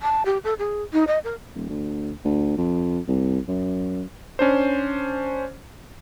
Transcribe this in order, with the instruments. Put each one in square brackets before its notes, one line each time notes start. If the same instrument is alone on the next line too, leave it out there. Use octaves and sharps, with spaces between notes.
[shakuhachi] A5
G4
A4
G#4
D#4
D#5
A#4
[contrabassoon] D#1
D2
D2
F2
C2
F#2
[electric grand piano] C#4 D4 C5